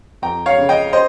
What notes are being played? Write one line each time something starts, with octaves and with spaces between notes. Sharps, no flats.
F2 G5 A#5
C#5 F5
C#3
D#5 G5
C5 D#5